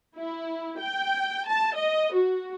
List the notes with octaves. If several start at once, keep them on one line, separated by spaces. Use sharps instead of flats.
E4
G5
A5
D#5
F#4